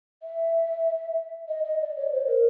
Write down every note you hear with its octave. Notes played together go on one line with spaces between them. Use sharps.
E5
D#5
D#5
D5
C#5
C5
A#4